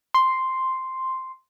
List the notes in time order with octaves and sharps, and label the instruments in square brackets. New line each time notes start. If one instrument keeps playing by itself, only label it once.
[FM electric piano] C6